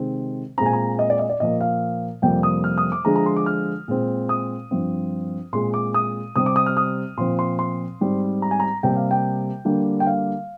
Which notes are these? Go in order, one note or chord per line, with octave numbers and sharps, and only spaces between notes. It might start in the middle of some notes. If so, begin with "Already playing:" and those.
Already playing: C3 D#3 G#3 C4
A#2 G#3 C4 A#5
G#5
A#5
D#5
D5
D#5
D5
A#2 F3 A#3 D#5
F5
F2 C3 G3 A#3 G5
D#6
F6
D#6
D6
D3 F3 G#3 A#5
A#5
C6
D6
F6
A#2 G#3 C4
D#6
G2 F3 C4
A#2 G#3 C4 C6
D6
D#6
C3 G3 C4 D#6
D6
D#6
F6
D#6
A#2 F3 C4 C6
C6
C6
G#2 G3 C4
A#5
G#5
A#5
C3 G3 A#3 G5
F5
G5
D3 G3 A#3
G5
F5